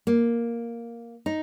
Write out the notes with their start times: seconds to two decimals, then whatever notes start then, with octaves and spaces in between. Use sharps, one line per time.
0.07 A#3
1.26 D#4